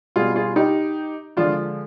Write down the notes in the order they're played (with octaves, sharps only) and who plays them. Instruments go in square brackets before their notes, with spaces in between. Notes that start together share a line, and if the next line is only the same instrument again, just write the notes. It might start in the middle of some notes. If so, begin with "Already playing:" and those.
[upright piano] B2 G3 F4 G#4
F4 G#4
D#4 G4
D3 F3 G#3 D4 F4